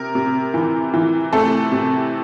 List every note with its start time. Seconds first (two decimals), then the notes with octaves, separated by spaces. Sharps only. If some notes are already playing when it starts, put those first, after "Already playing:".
Already playing: C3 A#4
0.15 C3
0.54 E3
0.94 E3
1.33 C3 A3 A4
1.72 C3